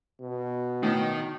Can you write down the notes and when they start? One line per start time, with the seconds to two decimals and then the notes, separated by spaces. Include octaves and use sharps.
0.21 B2
0.83 A2 D#3